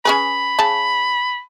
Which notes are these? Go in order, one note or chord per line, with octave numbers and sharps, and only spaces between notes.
C#4 G#4 B4 B5
C#3 A5